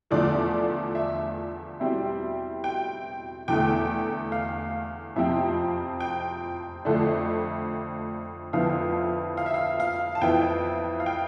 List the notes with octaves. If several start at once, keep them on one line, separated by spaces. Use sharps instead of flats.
E2 D3 F3 A3 D5
E5
B2 G3 C4 E4
G5
E2 D3 A3 G5
F5
F2 C3 F3 C4 E5
G5
F2 D3 A3 D4
F2 D3 F3 B3 E4 F5
F5
E5
F5
F5
A5
F2 E3 B3 E4 G5
F5
G5